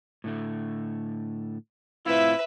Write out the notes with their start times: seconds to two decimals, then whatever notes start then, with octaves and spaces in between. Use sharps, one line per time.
0.24 A2 D3 A3
2.06 A2 C4 E4 F4 B4 E5